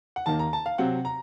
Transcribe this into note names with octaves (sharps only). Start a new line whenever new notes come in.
F#5
D#2 D#3 A#3 A5
A#5
A5
F5
C3 F#3 C4 F#5
A#5